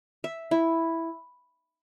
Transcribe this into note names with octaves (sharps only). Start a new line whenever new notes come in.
E5
E4